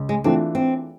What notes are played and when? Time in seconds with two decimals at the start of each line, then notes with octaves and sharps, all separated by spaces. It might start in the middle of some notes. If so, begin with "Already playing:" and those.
Already playing: C#2
0.09 G#3
0.24 E3 A3 C4 D4 F4
0.55 C4